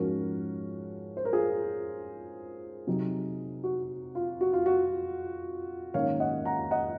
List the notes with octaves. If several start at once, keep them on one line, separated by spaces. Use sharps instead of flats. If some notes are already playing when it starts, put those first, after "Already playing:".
Already playing: G#2 F3 G#3 C#4 F#4 A#4
C5
A#4
F4 G#4
C3 F#3 C4 D#4
F#4
F4
F#4
F4
F#4
G#2 D#3 A#3 C#4 C#5 F5
D#5 F#5
F#5 A#5
D#5 F#5